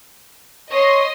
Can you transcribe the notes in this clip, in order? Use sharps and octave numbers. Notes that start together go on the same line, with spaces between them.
C#5 D#5 C6